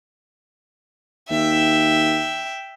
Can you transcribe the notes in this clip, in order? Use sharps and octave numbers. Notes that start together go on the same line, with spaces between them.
D#2 E5 G5